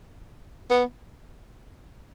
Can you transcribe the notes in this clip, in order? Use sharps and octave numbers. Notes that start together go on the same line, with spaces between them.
B3